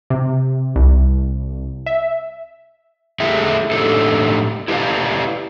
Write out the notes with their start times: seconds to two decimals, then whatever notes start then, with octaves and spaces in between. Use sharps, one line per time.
0.10 C3
0.76 C2
1.86 E5
3.20 A3 E4 G4 G#4 E5
3.71 A2 F#3 D4 D#4 G4 A4
4.68 E4 G4 B4 D5 F5